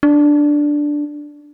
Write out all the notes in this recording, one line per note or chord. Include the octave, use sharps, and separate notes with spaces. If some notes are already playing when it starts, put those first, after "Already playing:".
D4